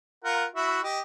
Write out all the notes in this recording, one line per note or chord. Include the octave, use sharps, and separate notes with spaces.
F4 A#4 F#5
E4 F#4 E5
G4 D#5